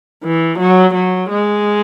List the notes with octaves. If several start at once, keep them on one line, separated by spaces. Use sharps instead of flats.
E3
F#3
F#3
G#3